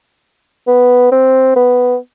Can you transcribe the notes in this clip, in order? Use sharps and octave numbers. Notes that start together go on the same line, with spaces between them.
B3
C4
B3